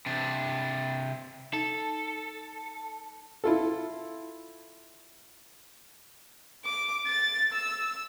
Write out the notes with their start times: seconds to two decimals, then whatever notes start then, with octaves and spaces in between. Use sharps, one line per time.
0.06 C3 D4
1.53 D#4 A4
3.44 E4 F4 A4
6.65 D6
7.07 A6
7.53 E6